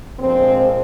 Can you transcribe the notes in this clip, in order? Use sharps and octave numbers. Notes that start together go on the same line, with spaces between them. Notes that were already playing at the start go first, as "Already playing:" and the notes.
A#1 A#2 F3 G#3 C4